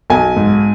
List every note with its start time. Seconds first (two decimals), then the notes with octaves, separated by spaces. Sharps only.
0.10 B1 G#5
0.36 G#2